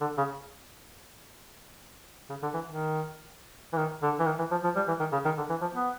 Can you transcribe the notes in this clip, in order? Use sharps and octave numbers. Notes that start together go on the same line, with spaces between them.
D3
C#3
C#3
D3
E3
D#3
E3
D#3
D3
E3
D#3
E3
F3
F3
G3
E3
D#3
C#3
D#3
D3
E3
F3
B3